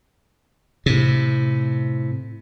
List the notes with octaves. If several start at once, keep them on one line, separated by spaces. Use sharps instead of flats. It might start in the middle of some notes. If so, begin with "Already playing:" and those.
A2 C3